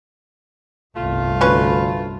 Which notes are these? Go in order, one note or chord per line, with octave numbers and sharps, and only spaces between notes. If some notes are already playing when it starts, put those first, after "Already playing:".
G1 C2 A3 F4
D2 C#4 B4